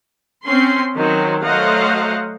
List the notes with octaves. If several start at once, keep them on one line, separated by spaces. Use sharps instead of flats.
C4 C#4 C6
D#3 F#3 C5
F#3 A3 C5 D#5 F5 F#5